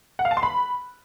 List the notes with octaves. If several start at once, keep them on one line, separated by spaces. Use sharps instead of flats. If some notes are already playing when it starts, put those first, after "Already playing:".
F#5
F5
A5
C6
B5